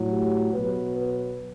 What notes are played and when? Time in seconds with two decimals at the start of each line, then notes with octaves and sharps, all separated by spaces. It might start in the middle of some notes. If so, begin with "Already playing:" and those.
Already playing: A2 F#3
0.09 G4
0.53 B2 F#3 B4
0.97 B4